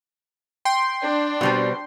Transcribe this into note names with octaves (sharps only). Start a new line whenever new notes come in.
G5 C6
D4
B2 G3 C4